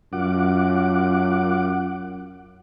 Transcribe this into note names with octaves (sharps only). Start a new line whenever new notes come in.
F#2 F4 F#5 D6